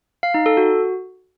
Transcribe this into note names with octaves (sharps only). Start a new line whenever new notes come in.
F5
D#4
A4
F#4